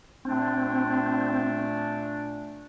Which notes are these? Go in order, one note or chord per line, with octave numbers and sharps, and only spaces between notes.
A#2 A3 C4 D4